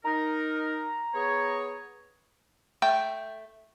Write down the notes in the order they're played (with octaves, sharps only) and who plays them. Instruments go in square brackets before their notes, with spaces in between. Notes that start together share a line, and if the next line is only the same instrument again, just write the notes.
[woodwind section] D#4 A#4 [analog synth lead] A#5
[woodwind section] B3 G#4 C#5
[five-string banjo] A3 G5 A5